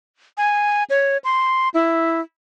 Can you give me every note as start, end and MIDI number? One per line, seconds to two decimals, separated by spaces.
0.37 0.84 80
0.90 1.18 73
1.24 1.69 84
1.74 2.21 64